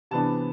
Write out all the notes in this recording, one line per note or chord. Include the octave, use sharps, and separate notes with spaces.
C3 E3 B3 D4 A5